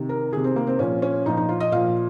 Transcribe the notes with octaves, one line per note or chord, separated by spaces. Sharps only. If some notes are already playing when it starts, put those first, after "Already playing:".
Already playing: C3 D#3
A#4
C3 D#3 G#4
C4
A#3
C4
A#2 F3 C#4
C#4
A#2 F3 D#4
D#4
F4
D#5
A#2 F3 F5